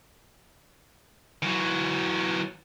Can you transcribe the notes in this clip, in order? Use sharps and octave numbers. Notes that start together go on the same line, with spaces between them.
E3 F#3